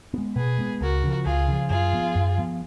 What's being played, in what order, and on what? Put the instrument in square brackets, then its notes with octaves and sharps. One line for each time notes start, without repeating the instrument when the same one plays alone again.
[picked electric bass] G#3 B3
[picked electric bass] B2 [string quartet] G#4 B4
[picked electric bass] G#3 B3
[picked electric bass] C#2 [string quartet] F#4 A#4
[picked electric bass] C#3 F3
[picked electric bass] C#2 [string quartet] F4 G#4
[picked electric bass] C#3 F3
[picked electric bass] F#2 [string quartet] F4 G#4
[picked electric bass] F3 B3
F#2
F3 B3